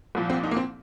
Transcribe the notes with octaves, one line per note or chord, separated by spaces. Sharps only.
C2 A#2 F3
C4
D#4
A#3
C4